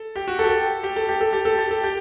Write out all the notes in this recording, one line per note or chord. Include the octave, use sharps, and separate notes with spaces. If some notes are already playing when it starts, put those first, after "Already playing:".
Already playing: A4
G4
F#4
A4
G4
A4
G4
A4
G4
A4
G4
A4
G4
A4
G4